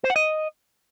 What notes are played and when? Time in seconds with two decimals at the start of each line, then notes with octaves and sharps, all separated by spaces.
0.04 C5
0.10 F#5
0.16 D#5